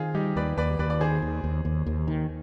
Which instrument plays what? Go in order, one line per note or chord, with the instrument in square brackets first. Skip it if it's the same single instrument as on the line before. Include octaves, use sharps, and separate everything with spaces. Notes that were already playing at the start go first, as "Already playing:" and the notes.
Already playing: [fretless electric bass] D#3 [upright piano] C4 D#4 F4 G#4
[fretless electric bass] G3 [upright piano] D#4 G4
[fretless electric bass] D#2 [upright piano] B4 D5
[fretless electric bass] D#2 [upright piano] B4 D5
[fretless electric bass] D#2 [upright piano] B4 D5
[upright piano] D5
[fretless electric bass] D#3 [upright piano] G#4 C5
[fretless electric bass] D#2
D#2
D#2
D#2
D#3